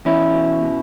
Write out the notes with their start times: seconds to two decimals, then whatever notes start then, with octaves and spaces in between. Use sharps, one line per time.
0.05 E2 C#4 E4
0.33 B2
0.62 B2